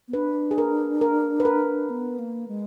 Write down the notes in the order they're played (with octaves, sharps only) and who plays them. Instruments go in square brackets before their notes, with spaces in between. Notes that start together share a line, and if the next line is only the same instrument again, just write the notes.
[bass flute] B3
[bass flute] D4 [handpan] B4
[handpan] G#4
A#4
A#4
B4
A#4
[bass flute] B3
A#3
G#3